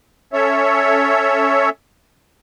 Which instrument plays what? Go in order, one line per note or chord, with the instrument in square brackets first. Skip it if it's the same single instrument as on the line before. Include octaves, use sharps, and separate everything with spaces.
[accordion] C#4 A4 C#5 E5